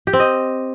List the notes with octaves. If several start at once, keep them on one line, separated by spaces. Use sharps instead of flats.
G4
C4
D#5